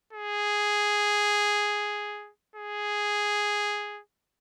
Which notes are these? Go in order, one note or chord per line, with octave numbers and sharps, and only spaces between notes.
G#4
G#4